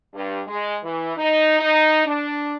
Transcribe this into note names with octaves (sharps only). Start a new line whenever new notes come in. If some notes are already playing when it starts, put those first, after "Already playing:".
G2
G#3
E3
D#4
D#4
D4